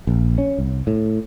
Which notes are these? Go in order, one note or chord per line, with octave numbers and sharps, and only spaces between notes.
A#1
C#4
C2
A2